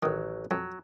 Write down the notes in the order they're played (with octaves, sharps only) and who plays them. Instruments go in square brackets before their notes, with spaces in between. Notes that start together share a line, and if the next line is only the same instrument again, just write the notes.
[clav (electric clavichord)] A1 F#3 [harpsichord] D#3
[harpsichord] F2 [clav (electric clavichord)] F#3